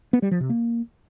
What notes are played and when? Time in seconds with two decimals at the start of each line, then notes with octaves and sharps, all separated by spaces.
0.13 B3
0.22 G3
0.31 F3
0.40 C3
0.49 A#3